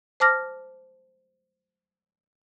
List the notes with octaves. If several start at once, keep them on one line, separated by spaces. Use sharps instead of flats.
C5 A5 D6 F6 A#6